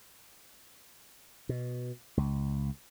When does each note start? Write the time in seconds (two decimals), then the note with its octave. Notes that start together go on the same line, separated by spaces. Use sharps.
1.49 B2
2.17 C#2